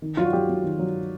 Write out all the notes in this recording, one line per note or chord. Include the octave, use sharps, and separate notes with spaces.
D#3
F#3 F4
F#4
F#3 G4
F#3
D#3
F#3